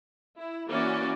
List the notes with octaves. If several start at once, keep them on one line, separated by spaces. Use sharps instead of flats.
E4
E3 A#3 C#4 F#4 D5